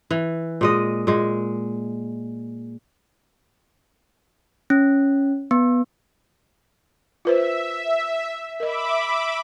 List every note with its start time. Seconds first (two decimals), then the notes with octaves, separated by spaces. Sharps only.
0.11 E3
0.61 A#2 G#3 D#5
1.07 A#2 G#3
4.70 C#4
5.51 B3
7.25 F4 B4 C5 E5
8.60 A#4 D#5 E5 B5 D6